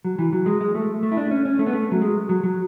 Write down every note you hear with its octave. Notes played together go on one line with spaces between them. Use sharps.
F#3
E3
F#3
G#3
G#3
A3
A3
E4
D4
C#4
C#4
A3
B3
A3
F#3
G#3
F#3
F#3